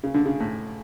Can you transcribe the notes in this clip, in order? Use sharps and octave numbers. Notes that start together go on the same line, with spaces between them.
C#3
D3
C#3
A2